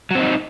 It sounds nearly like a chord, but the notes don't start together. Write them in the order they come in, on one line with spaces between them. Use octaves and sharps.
F#3 C4 D#4